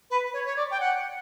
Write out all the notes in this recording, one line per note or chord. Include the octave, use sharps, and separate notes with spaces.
B4
C#5
C#5
D5
G5
F#5